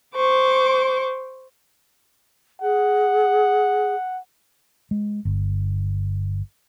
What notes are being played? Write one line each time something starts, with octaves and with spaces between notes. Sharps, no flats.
C5 C#6 D6
G#4 F#5
G#3
G1